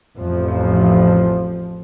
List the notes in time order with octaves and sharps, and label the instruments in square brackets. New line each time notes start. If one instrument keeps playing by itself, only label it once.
[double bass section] A1 F2 F3